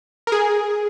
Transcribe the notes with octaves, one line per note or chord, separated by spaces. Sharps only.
A#4
G#4